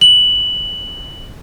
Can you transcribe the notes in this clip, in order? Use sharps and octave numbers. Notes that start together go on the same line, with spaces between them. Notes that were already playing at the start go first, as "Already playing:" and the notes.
F#7